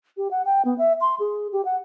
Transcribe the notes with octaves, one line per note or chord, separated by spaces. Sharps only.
G4
F#5
G5
B3
E5
C6
G#4
G4
F#5